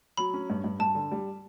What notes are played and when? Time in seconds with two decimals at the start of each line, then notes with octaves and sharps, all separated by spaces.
0.17 F#3 B5
0.34 C#4
0.50 G2
0.64 G2
0.79 G2 A5
0.95 D3
1.12 G3